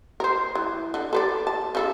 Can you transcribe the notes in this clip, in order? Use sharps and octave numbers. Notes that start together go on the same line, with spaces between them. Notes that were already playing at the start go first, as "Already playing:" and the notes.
A#4 C5
E3
D3
A4 B4 D5
A5
C#3 A4 E5